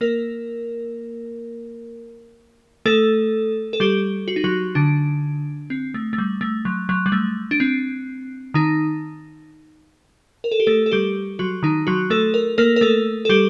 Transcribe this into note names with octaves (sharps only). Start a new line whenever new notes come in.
A#3 A#4
A3 A4
A4
G3 G4
F#4
D#4
F#3 F#4
D3 D4
C4
A3
A3
G3
A3
F#3
F#3
G3
A3
D4
C4
D#3 D#4
A#4
A4
G4
A3 A4
A4
G3 G4
F#3 F#4
D#3 D#4
F#3 F#4
A3 A4
A#4
A#3 A#4
A#4
A3 A4
A4
G3 G4